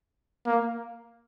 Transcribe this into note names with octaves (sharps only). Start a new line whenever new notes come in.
A#3